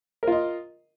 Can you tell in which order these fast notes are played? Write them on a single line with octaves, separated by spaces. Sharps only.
A#4 F4 D#5